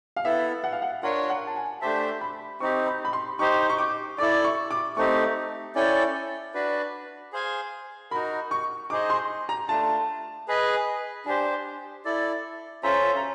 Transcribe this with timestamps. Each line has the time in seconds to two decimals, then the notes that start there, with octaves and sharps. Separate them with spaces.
0.16 F5
0.25 B3 E4 A4 E5
0.64 F#5
0.73 F5
0.82 F#5
1.03 D4 F4 A#4 C#5 F#5
1.29 F#5
1.47 A5
1.56 G#5
1.82 A3 D4 G4 C5 E5 A5
2.21 B5
2.60 C4 D#4 G4 C#6
2.87 B5
3.05 B5
3.13 C6
3.39 D#4 G4 C5 C#6
3.70 C#6
3.78 D6
4.18 E4 A4 D5 D6
4.44 C#6
4.71 D6
4.97 A3 C4 D#4 G4 C#6
5.75 C#4 E4 A4 D5 G5
6.54 D4 F#4 B4 D5
7.33 G#4 C5 F5 G#5
8.11 D#4 F#4 A#4 B5
8.51 C#6
8.90 D#4 G#4 C5 D#5 D6
9.10 C6
9.49 A#5
9.69 A3 D4 F4 A5
10.48 G#4 B4 D#5
11.26 D4 G4 C5 G#5
12.05 E4 A4 D5
12.83 C#4 F4 A4 C5 E5 A#5
13.17 A#5